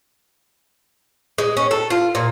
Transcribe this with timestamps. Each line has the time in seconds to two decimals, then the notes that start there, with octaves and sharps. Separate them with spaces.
1.38 G#3
1.57 C#4
1.71 A4
1.90 F4
2.15 A#2